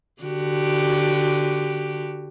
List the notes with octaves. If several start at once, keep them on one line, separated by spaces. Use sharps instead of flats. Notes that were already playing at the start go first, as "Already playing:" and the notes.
D3 F#4 G4